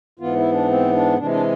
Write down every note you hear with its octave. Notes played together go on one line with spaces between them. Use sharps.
G#2 E3 B3 F4
E4
D4
C4
D4
C3 E3 G#3 D4
D4